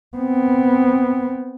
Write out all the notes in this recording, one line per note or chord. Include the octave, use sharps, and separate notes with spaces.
B3 C4